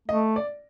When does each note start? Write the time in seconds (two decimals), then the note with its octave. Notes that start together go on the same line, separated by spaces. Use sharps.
0.08 A3 D#5
0.36 D5